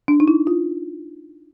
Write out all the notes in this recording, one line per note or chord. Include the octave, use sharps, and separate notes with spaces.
D4
D#4
E4
F4